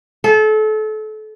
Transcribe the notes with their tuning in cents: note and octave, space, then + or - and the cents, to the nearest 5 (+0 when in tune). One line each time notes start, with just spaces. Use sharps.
A4 -30